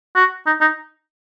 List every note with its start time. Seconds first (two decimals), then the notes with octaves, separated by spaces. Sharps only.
0.15 F#4
0.46 D#4
0.61 D#4